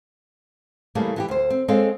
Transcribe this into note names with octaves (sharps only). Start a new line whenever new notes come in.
C#3 E3 G3 A3 A#3
E3 F#4 G4
D2 C5
C4
G#3 C4 A4 C#5 F5